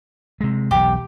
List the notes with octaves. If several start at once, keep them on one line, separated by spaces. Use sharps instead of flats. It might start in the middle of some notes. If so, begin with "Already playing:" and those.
C3 G#3
E1 B1 G4